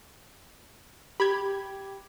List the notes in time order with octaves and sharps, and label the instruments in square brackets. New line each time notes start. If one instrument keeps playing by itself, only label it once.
[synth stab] G4 [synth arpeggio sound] B5 G#6